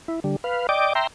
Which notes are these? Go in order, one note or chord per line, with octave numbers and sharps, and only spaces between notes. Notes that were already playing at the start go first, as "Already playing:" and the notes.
E4
D3 G3
B4 F5
D5 D#5 G5 D6
E5 G5 A#5 C6